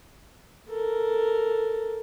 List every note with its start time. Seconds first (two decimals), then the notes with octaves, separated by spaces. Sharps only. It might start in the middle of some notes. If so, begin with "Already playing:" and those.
0.68 A4 A#4